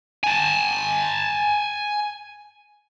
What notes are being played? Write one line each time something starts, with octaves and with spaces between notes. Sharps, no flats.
G#5 A5